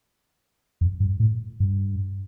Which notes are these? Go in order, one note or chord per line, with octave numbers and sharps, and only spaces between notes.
F2
G2
A2
G2